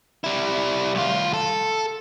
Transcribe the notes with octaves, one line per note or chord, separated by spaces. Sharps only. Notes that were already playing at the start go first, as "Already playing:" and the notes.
G3 E4
C2 F4
A4